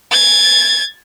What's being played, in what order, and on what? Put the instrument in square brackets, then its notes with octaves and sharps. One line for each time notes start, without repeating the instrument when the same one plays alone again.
[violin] G#6 A6